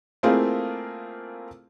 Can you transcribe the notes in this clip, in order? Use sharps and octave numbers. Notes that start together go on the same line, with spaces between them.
A3 A#3 C4 E4 F4 G#4